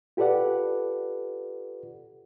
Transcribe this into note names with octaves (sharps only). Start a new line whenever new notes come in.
F4 G4 A4 B4 D5 F#5